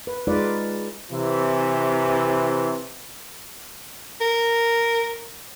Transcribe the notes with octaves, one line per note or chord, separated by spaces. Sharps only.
B4
G#3 D#4 F4 B4 D5
C3 E3
A#4